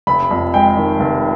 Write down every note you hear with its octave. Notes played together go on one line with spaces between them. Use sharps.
F1 B5
F2
G#3 G5
D#3
F1